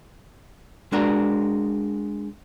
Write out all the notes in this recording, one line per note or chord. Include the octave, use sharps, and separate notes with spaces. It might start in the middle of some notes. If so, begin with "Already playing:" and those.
G#3 D4 F#4 A#4